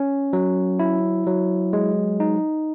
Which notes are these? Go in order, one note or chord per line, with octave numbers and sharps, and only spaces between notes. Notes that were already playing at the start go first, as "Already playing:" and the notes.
Already playing: C#4
F#3
E4
F#3
G#3
D#4